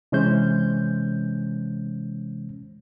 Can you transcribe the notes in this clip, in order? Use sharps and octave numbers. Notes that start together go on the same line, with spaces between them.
C3 E3 G#3 C#4 C5 G6